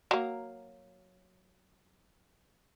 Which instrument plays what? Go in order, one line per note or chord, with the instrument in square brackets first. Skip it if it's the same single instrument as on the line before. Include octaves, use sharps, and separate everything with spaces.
[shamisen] F#3 A#3